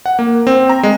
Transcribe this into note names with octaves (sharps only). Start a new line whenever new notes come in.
F#5
A#3
C4
A#5
G#3